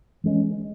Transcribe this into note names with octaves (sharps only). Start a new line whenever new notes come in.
E3 G#3 C#4